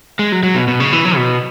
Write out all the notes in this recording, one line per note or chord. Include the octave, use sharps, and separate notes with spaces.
G#3
F#3
F#3
B2
B2
C#3
E3
F#3
B2